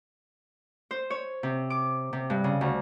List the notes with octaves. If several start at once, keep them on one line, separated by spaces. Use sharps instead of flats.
C5
C#5
C3
D6
C3
G2
C#3
D2